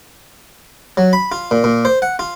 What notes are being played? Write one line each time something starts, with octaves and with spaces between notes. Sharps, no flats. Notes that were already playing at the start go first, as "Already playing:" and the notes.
F#3
B5
F4
A#2
A#2
C5
F#5
F4